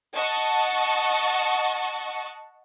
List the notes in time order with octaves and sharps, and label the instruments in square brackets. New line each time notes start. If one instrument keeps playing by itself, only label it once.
[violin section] D#5 F#5 A5 C#6